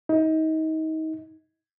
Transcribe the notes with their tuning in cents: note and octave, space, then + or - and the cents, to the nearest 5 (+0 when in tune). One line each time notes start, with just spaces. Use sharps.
D#4 +30